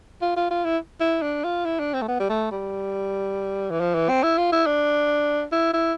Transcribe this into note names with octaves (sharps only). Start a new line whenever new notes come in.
F4
F4
F4
E4
E4
D4
F4
E4
D4
C4
A3
B3
G3
A3
G3
E3
F3
E3
C4
E4
F4
E4
D4
E4
E4